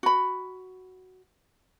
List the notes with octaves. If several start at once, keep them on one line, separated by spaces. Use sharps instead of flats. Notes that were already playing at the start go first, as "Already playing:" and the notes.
F#4 B5